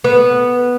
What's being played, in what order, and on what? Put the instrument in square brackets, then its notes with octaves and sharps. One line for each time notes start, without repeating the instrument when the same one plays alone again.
[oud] B3